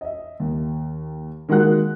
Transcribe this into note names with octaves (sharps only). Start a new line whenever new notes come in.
D#5 E5
D#2
D#3 G#3 A#3 F#4 F#5 F#6